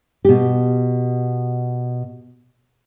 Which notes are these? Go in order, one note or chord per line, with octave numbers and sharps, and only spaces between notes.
B2 G4